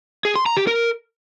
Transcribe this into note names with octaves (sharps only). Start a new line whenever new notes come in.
G#4
C6
A#5
G4
A#4